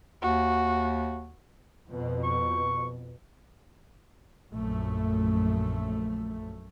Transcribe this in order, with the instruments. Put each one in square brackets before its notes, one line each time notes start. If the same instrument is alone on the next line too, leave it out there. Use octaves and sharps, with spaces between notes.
[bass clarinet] D#2 [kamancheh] F#4
[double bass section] F2 B2
[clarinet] C#6
[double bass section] A#1 F#2 A3